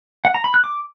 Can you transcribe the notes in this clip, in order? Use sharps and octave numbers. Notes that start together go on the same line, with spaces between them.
F#5
A#5
B5
F#6
D6